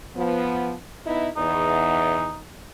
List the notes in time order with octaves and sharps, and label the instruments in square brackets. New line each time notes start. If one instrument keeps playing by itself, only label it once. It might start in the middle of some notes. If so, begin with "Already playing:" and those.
[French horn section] F3 B3
B3 D#4 E4
[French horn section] E2 [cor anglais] D#4